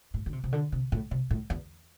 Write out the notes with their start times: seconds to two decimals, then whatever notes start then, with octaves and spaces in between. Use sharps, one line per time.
0.14 A2
0.26 D3
0.33 C3
0.44 C3
0.52 D3
0.72 C3
0.92 A2
1.11 C3
1.31 A2
1.50 E2